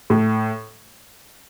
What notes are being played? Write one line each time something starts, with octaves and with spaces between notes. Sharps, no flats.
A2